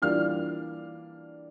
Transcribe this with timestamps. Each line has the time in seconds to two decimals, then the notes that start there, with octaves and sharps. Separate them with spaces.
0.02 E3 G3 A#3 D4 F4 F5 F6